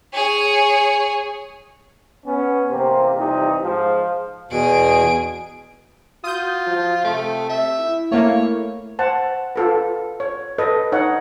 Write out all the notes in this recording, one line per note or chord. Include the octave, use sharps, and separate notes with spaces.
G#4 C#5
B3 C#4
A1 C3 A#3 C5
F2 C3 E3 G3 D#4
G#2 F3
E2 B2 G#4 D7
F4 F#4 D#6 G6
F3
C3 A3
E5
E4
A3 A#3 C#5
C5 F#5 A5
F4 A4 B4
C#5
A4 B4 D#5
D#4 C#5 D#5 F#5